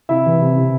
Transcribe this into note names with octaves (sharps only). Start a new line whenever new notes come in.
C3 E4 E5
E3
C3
C3